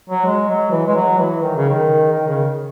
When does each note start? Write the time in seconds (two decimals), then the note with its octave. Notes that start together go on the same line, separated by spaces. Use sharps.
0.10 F#3
0.26 G#3
0.49 F#3
0.71 E3
0.87 G#3
0.96 F#3
1.18 E3
1.42 D#3
1.56 C#3
1.69 D#3
2.13 D#3
2.28 C#3